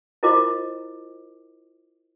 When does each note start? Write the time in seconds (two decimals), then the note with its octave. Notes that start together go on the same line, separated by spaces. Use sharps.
0.23 E4 F4 A#4 C5 D#5 D6